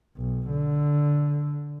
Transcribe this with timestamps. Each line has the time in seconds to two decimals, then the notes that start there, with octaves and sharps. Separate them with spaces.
0.17 B1
0.50 D3